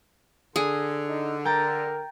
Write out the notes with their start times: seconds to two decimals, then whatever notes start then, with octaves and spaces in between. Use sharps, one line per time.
0.56 D3 G#4
1.09 D#4
1.45 A#4 G5 A#5 A6